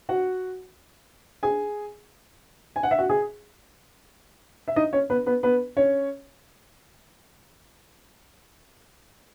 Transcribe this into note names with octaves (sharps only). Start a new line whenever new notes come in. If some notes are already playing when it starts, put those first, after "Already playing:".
F#4 F#5
G#4 G#5
G#5
F#5
E5
F#4 F#5
G#4 G#5
E5
D#4 D#5
C#4 C#5
B3 B4
B3 B4
B3 B4
C#4 C#5